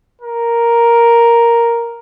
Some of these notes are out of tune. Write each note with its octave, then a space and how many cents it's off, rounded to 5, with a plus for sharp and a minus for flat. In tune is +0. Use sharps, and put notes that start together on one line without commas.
A#4 +5